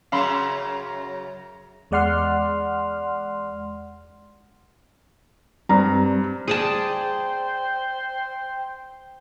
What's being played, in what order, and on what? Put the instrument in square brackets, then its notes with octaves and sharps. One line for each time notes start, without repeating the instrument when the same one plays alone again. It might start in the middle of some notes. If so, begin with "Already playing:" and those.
[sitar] F#2 C#3 [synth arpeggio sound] F5 B5 C6
[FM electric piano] E2 G#3 D5 F#5 C6 F6
[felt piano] G2 A#5 [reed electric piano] G3 C4
[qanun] G#4 D5 A5 [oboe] C5 [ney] G5